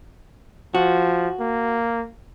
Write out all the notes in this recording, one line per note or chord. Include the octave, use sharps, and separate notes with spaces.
F3 F#4
A#3